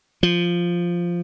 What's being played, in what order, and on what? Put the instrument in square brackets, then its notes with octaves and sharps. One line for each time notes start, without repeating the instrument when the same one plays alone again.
[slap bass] F3